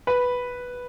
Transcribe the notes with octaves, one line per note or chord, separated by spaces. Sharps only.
B4